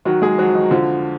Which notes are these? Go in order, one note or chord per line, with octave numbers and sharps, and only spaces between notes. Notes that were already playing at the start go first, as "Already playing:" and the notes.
D#3 F#3 F#4
G#3 G#4
F2 F#3 F#4
D#3 D#4
D3 F3 F4